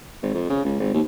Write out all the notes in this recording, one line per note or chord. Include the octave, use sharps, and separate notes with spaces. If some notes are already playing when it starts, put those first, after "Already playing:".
G#1
F2
C#3
C#2
G#1
D#2